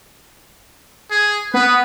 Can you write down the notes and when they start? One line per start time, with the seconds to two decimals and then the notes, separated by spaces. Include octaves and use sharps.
1.11 G#4
1.54 B3 B4